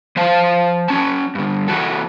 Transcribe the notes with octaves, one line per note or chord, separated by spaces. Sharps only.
F3 C5 F5 A5
F#3 C#4 A5
G2 D3
E3 F#4 A4